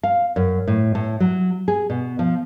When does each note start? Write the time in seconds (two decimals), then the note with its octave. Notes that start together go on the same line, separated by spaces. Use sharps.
0.03 F5
0.36 F#2
0.67 A2
0.95 A2
1.20 F#3
1.68 G#4
1.90 B2
2.19 F3